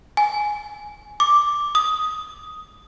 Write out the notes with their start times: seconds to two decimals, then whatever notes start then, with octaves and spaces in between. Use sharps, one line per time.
0.17 G#5
1.20 D6
1.75 D#6